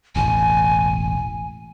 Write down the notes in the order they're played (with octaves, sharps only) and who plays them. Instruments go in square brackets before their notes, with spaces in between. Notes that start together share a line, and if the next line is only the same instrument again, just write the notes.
[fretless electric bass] E1 A1 [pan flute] G#5